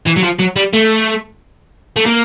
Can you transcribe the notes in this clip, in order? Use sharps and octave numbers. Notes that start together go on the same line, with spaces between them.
E3
F#3
F3
F#3
G3
A3
A3
A#3